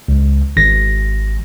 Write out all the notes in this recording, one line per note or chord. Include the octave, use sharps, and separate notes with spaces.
C#2
G#1 A#6